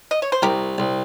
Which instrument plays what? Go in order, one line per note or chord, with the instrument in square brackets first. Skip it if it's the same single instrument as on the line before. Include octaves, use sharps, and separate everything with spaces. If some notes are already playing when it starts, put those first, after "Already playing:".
[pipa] D#5
C#5
C5
[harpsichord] C2 [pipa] G4 A#4
[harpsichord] C2